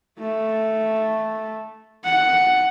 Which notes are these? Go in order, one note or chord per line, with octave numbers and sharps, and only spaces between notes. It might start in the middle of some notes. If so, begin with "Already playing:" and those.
A3
F#5